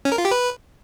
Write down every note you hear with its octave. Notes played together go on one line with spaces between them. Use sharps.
C#4
A#4
F4
G4
B4